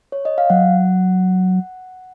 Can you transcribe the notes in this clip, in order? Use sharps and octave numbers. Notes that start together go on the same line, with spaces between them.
C#5
D#5
F5
F#3 F#5